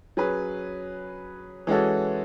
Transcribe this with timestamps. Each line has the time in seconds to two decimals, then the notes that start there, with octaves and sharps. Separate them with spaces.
0.17 F#3 C#4 G#4 B4
1.67 E3 G#3 C#4 F#4 A4